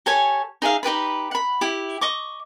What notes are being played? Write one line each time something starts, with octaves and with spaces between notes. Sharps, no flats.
G4 A4 C#5 G#5
D#4 G#4 E5 F5
D#4 G4 B4 B5
F#5 B5
E4 G4
D#5 C#6 D6